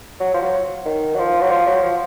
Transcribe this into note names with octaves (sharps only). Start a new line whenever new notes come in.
F#3
F3
F#3
D#3
F#3
F3
F#3
F3
F#3
F3